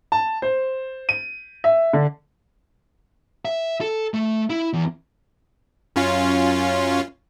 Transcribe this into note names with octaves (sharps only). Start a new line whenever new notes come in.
A5
C5
D#7
E5
D3
E5
A4
A3
E4
E2
F#2 C#4 F4